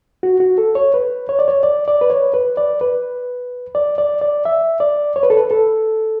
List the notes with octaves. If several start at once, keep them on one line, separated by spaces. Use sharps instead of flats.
F#4
F#4
A4
C#5
B4
C#5
D5
C#5
D5
D5
B4
C#5
B4
D5
B4
D5
D5
D5
E5
D5
C#5
B4
A4
B4
A4